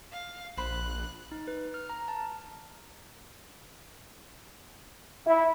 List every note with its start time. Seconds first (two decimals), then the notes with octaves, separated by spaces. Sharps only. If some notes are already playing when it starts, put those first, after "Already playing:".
0.12 F5
0.57 A#1 C5 B5 F#6
1.32 D#4
1.48 B4
1.74 F6
1.90 A#5
2.08 A5
5.26 E4